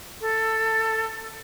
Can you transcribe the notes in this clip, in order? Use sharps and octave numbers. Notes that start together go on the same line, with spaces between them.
A4